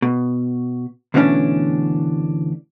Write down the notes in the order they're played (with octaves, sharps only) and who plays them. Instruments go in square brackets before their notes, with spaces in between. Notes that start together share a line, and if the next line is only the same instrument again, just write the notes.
[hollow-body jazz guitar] B2
D2 B2 E3 A#3 C#4 D4